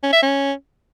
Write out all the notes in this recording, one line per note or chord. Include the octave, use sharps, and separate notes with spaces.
C#4
E5
C#4